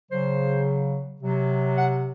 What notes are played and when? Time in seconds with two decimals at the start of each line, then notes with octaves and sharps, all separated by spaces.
0.11 C#3 F#3 C5
1.21 C3 F#3
1.77 F#5